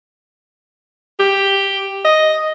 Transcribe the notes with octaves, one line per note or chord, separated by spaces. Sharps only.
G4
D#5